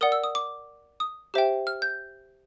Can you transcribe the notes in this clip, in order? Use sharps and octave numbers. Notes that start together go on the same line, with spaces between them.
A#4 D5 F#5 D#6
E6
D#6
D6
D#6
G4 C5 E5 G5
F6
G6